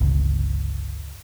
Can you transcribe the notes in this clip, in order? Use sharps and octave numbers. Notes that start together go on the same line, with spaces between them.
G1 C#2